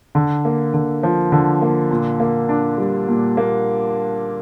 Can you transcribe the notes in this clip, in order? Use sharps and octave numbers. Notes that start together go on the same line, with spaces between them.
D3
A#3
D3
F3
D3
A#3
A#2
A#3
D4
G3
A#2
A#3